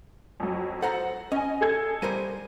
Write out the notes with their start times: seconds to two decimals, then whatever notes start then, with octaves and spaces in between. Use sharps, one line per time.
0.40 F2 F#3
0.82 A4 C5 F#5 A#5
1.32 C#4 D#5 G#5
1.61 G#4 A4 G#6
2.02 G3 A#4 C5 D#7